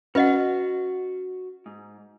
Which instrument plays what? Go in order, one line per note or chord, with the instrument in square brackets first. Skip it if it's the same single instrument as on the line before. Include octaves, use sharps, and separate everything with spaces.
[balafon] C#4 [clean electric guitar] F#4 [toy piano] B4 D#5 F#5
[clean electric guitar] G#2